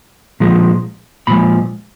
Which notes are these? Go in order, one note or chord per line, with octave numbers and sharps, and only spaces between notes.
A#2 F3 G#3
A#2 F3 G#3 B5